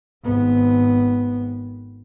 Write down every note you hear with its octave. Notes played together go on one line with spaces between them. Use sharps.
G#1 B3